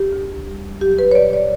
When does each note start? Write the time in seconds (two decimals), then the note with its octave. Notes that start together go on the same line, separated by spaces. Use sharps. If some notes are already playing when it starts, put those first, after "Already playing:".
Already playing: G4
0.13 D2
0.47 G3
0.81 F#3 G4
0.99 B4
1.11 C#5
1.15 A#2 D5
1.33 D5